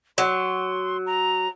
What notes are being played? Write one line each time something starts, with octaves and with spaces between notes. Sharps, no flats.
F#3 C6
A#5